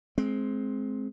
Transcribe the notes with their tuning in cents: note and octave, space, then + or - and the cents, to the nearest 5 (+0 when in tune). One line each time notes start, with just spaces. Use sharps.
G#3 +20 C4 +0